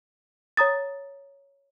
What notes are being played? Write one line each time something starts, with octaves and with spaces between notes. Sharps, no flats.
C#5 A#5 D#6 A6